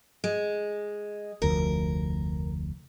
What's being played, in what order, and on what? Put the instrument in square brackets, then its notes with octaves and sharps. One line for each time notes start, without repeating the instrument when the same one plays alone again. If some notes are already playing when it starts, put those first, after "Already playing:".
[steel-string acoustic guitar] G#3
[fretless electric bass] F1 D2 F3 [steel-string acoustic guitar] A#4